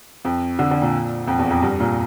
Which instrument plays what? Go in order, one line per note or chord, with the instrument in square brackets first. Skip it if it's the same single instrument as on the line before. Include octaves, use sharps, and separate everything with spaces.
[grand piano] F2
D3
D3
A#2
F2
E2
F2
G2
A#2